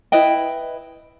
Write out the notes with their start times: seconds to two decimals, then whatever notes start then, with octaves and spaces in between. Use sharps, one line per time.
0.12 E4 B4 D#5 G5